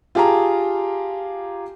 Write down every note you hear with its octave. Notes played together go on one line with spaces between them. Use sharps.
F4 G4 G#4 A5 A#5